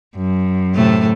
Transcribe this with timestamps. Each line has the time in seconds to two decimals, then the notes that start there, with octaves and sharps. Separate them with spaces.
0.16 F#2
0.75 A2 C3 A3